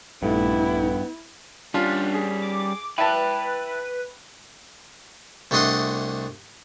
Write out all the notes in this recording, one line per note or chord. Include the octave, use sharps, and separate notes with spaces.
A#1 G2 A3 B3 D#4 E4
G3 C#4 D4 F4
G#4
D6
E4 B4 G5 A5 B5
C2 A3 D4 D#5 F#5 C6